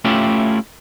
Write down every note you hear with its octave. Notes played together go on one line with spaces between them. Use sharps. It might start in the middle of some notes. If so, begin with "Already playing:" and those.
A3 C#4 E4 F4 G4